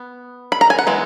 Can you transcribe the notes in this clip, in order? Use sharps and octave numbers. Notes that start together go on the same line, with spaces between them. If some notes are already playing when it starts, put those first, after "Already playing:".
Already playing: B3
B5
A#5
G#5
F#5
E3 G#3 B3